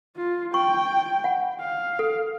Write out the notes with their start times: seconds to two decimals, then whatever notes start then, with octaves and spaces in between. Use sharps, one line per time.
0.17 F4
0.54 G5 C#6
1.24 F#5
1.60 F5
1.99 A4